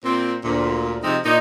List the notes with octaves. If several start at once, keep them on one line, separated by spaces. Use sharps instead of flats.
A#2 C4
D2 A#2
C3 F3 G#3 C4 D#4
A#2 D#4